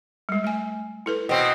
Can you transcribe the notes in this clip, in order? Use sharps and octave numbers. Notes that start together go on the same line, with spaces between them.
G3 G#3
A3 G#5
E4 A4 B4
B2 C4